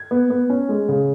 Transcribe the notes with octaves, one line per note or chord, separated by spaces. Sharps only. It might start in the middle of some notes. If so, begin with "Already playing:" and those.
Already playing: G#6
B3
B3
C#4
G#3
C#3